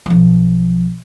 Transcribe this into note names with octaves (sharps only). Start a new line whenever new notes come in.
B1 F3